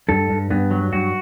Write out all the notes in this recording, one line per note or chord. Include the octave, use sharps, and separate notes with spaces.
G2 A4
G2
G2 B3
F#3
G2 F#4